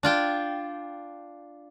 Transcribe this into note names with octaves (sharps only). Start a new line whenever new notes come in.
D4 F4 G5